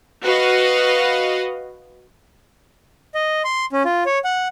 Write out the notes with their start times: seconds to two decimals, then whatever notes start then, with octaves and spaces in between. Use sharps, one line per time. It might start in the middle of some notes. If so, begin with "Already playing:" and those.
0.24 F#4 B4 D#5 F5
3.15 D#5
3.44 C6
3.72 C#4
3.85 F4
4.06 C#5
4.25 F#5